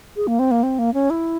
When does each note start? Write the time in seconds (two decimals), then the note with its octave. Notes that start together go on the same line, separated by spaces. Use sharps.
0.16 G#4
0.27 A#3
0.39 C4
0.51 A#3
0.63 C4
0.79 A#3
0.94 C#4
1.10 E4